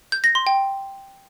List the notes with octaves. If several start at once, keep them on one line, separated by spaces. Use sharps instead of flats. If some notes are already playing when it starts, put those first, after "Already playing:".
G6
A#6
C6
G5